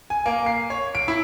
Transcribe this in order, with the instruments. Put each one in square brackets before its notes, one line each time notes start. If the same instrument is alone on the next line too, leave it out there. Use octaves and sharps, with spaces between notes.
[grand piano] G#5
A#3
C7
C#5
D7
E4